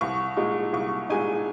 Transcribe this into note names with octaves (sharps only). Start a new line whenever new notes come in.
C2 C#6
A#2 G#3 D#4
C2 C#6
A#2 G#3 D#4 G#5